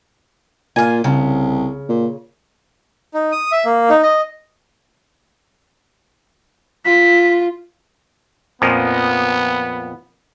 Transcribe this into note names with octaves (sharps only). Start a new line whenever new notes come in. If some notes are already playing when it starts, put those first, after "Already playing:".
A#2 F4 G#5
C2 C#3
A#2
D#4
D#6
E5
A#3
D#4
D#5
F4 B6
F2 A#2 F3 B3